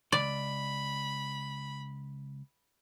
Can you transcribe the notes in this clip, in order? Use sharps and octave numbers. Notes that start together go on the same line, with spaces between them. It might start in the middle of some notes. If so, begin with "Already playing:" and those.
C#2 D5 B5